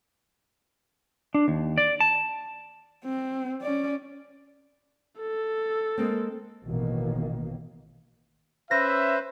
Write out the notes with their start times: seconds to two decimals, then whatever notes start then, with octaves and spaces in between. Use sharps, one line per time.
1.34 D4
1.48 D#2
1.78 D5
2.00 A5
3.05 C4
3.61 C#4 D5
5.19 A4
5.98 G#3 A#3 C4
6.65 A1 B2 D#3 A#3
8.71 C#4 B4 C5 E5 A#6